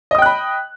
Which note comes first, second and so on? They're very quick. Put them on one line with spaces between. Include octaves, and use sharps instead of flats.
D#5 D#6 G5 F#6 B5